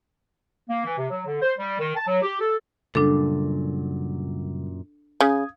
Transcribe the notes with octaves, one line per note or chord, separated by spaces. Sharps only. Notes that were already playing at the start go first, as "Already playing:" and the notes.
A#3
E3
C3
F#3
D3
C5
G3
D#3
A5
F#3
G4
A4
F#2 A#2 C#3 G3 D4 A4
C#3 D#6 G#6